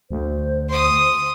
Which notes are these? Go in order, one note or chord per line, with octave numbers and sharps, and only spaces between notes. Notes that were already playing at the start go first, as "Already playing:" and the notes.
D2 C5
C6 D#6